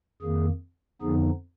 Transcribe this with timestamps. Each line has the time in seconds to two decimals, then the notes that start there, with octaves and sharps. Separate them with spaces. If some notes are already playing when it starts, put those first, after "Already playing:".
0.21 F2 D#3 A#3 G#4
1.02 F2 D3 F3 B3 D#4 G#4